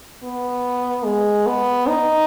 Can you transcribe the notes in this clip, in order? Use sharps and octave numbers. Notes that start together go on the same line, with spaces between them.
B3
G#3
B3
D#4